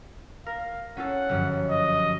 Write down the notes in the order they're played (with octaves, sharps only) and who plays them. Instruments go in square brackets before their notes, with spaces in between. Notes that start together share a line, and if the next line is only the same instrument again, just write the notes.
[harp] A#4 [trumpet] F5
[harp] C#4 F4 A4 [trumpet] F#5
[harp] G1 F#2 F3
[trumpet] D#5